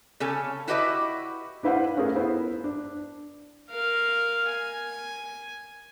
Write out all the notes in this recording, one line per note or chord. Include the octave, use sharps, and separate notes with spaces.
C#3 C#4 A4 G#5
E4 F#4 G4 B4 D#5 E5
D4 E4 B4 C5 F5 F#5
A3 C#4 F4 G#4 A#4 B4
B3 E4 C5
D4
A#4 F5
G#5